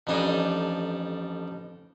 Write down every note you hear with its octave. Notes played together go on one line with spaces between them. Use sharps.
A1 F2 G3 D4 D#4 G#5